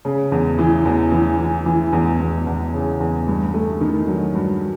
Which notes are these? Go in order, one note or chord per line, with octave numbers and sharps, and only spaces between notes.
C#3
E2
E3
E2
E3
E3
E3
E2
E2
E2
C#3
E2
G2
A3
D#3
F#3
G2